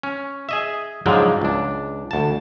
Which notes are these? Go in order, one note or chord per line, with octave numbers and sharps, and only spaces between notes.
C#4
G#4 D#5 E5
G#2 C#3 F3 F#3 G#3 D4
C#2 D4
D2 A5